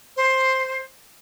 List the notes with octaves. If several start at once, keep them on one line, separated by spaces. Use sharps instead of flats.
C5